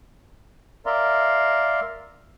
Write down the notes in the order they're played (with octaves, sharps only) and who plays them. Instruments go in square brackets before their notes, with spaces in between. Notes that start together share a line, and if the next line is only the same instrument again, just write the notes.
[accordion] A#4 D5 E5 F5 A#5 C6